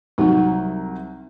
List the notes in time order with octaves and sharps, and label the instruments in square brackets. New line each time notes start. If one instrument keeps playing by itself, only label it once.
[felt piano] C2 F#3 [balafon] D#4